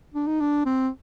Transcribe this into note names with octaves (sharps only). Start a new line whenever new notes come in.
D4
D#4
D4
C4